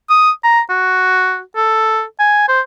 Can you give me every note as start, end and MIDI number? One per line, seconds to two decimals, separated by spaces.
0.10 0.31 87
0.44 0.60 82
0.70 1.40 66
1.56 2.03 69
2.20 2.45 80
2.48 2.60 72